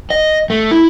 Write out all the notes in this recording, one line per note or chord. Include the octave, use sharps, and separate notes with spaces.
D#5
A3
E4